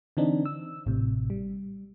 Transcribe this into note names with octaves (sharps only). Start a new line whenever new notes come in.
D3 E3 C4 D4 D#4
E6
A1 A2 C3
G3